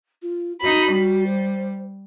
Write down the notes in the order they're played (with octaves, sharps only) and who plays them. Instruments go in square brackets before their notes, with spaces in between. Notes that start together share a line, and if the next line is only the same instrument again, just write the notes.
[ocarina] F4
[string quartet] D#4 B5 [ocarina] F#4
[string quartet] G3
[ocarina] C5